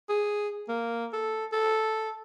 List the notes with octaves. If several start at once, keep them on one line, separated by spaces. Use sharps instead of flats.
G#4
A#3
A4
A4